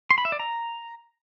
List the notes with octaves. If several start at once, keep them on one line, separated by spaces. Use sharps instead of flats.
C6
B5
E5
D5
A#5